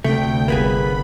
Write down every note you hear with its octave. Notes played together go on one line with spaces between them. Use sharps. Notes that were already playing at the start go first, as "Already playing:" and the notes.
D2 C3 A3 G5
G1 A#3 B3 G#4 B5